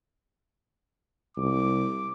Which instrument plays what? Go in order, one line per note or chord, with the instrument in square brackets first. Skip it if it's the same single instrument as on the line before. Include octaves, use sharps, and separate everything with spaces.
[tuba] C2 [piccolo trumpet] D6